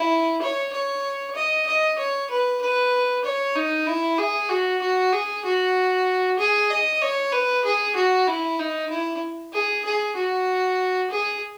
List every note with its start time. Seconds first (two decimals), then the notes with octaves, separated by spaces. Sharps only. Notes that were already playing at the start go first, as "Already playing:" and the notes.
Already playing: E4
0.41 C#5
0.73 C#5
1.35 D#5
1.67 D#5
1.98 C#5
2.30 B4
2.61 B4
3.24 C#5
3.56 D#4
3.87 E4
4.18 G#4
4.50 F#4
4.82 F#4
5.13 G#4
5.44 F#4
6.39 G#4
6.70 D#5
7.02 C#5
7.32 B4
7.64 G#4
7.96 F#4
8.27 E4
8.59 D#4
8.90 E4
9.53 G#4
9.85 G#4
10.16 F#4
11.10 G#4